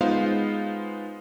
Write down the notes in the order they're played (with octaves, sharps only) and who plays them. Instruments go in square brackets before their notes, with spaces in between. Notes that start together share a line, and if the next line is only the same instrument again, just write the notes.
[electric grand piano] G#3 B3 D#4 F4 C5 F5